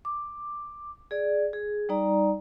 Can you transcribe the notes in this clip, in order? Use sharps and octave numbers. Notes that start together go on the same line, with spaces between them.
D6
G#4 D5
G#4
G3 D#4 D5 A#5